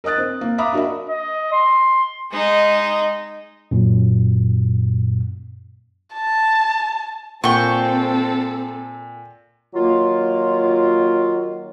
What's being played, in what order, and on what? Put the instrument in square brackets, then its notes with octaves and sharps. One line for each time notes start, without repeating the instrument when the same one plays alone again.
[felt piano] A#4 D#5 D#6 F#6 A6
C4
A#3
E5 F5 A#5 B5 D6 D#6
D4 F#4 A#4 D#5 E5
[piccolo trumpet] D#5
C6
[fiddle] G#3 D#4
[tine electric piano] F#2 A#2
[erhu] A5
[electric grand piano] A#2 [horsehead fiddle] C4 [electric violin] A4 [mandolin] G5 C#6
[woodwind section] D#3 F#3 A#3 F4